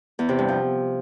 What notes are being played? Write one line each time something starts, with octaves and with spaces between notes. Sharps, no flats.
E2
C3
G2
F3